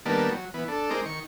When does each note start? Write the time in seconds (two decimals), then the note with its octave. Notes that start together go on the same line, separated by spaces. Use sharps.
0.06 D#3 G3 A#3 B3 D4 A5
0.31 F#3
0.54 E3 B3
0.68 D4 A4
0.90 G#3 C4 D#4 A#4 D6
1.06 D#3 C#6